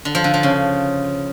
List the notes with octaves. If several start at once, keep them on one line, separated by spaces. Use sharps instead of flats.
D3
F3
D3
F3
C#3